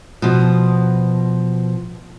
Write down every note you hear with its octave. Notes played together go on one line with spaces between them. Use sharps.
B2 F3